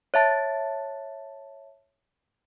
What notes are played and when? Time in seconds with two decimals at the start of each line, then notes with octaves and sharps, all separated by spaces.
0.14 C#5 E5 A5 A6